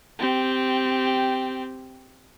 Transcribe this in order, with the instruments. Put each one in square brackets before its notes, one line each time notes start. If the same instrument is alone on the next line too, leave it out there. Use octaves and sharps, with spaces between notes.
[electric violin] C4 G4